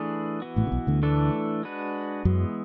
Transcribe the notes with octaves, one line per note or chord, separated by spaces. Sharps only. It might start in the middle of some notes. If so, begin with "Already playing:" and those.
Already playing: E3 A3 D4 G#4 B4
E3 B3 F#4
A1 A2
C#3
B1 B2
D2 D3
E3 A3 D4 A4
G#3 D4 F#4 B4
F#2 E3 F#3 G#3 B3